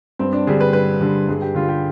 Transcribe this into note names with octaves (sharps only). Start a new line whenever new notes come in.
G2 C4
D4
D3 G3 G#4
B4
G2 B4
D3 G3
G2 G#4
G4
D3 G3 F4
G4